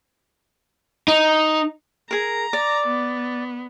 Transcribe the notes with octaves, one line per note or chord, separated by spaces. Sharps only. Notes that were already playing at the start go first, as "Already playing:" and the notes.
D#4
G#4 A#4 A#5
D5
B3